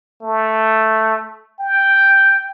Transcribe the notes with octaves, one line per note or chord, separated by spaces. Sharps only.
A3
G5